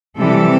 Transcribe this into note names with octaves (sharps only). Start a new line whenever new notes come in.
C3 E3 G3 A4